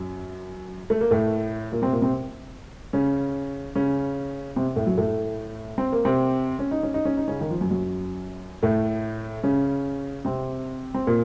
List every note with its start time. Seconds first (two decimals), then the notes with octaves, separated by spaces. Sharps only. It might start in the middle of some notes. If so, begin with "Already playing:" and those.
Already playing: F#2 F#3
0.90 A3
1.01 A#3
1.11 A2 A3
1.72 A#2 A#3
1.82 C3 C4
1.92 A#2 A#3
2.02 C3 C4
2.93 C#3 C#4
3.75 C#3 C#4
4.56 C3 C4
4.76 A2 A3
4.86 F#2 F#3
4.98 A2 A3
5.78 C4
5.92 A#3
6.05 C3 C4
6.59 C#4
6.71 D#4
6.83 C#4
6.94 D#4
7.05 C#4
7.17 D#4
7.28 C#3 C#4
7.41 D#3
7.50 F3
7.61 F#2 F#3
7.71 F#2 F#3
8.63 A2 A3
9.43 C#3 C#4
10.25 C3 C4
10.94 C4
11.07 A#2 A#3